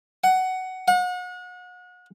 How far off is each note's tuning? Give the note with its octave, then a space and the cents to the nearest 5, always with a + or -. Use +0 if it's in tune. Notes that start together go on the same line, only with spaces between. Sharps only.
F#5 +15
F#5 -35